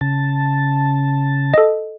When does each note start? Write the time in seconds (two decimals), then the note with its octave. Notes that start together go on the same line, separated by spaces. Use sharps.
0.01 C#3 A5
1.54 A4 D#5